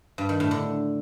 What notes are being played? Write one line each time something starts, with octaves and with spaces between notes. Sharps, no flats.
G2
D#3
A2
D3